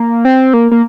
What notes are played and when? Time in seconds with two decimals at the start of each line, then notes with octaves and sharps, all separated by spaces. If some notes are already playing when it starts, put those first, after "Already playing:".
Already playing: A#3
0.25 C4
0.54 A#3
0.71 A#3